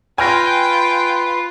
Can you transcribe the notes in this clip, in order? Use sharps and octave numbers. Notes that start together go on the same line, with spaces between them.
F4 B4 G5 G#5 F6 A#6